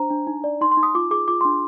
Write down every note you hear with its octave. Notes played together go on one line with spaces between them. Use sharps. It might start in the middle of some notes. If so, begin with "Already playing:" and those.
Already playing: D4 C5 A#5
D4
D#4
D5
D#4 C6
C6
D#4
D#6
F4 D6
G#4 D6
F4 D6
D4 C6